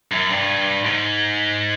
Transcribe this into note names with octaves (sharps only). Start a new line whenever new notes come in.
F#2
G2
G#2